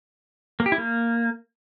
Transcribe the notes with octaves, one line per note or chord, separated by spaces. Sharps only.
A#3
G4
E4
A#3